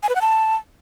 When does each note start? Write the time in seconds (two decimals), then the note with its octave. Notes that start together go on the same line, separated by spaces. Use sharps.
0.03 G#5
0.09 B4
0.15 F#5
0.21 A5